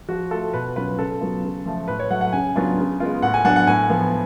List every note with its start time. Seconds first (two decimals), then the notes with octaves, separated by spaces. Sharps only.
0.09 F3 F#4
0.31 A3 F4 A4
0.53 B2 B4
0.76 F#3 C#4 F4 B4
0.98 C#3 A4
1.21 F#3 B3 F4
1.43 C#3
1.66 F3 A3
1.88 A2 B4
1.99 C#5
2.10 F#3 A3 F#5
2.21 F#5
2.33 C#3 G#5
2.56 F#3 B3 D4 F4
2.78 C#3
3.00 G#3 B3 F4
3.22 A2 F#5
3.34 G#5
3.45 F#3 B3 D4 F#5
3.56 F#5
3.67 A2 G#5
3.90 F3 B3 F4